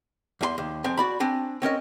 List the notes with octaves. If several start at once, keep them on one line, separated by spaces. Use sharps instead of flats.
E2 G#4 C6
D#2
F2 C4 G#5
F#4 D5 B5
C4 D4 G#5
C4 C#4 A#4 D#5